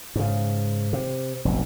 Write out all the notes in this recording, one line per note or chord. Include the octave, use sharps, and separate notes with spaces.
G#2 C#3
C3
F1 B1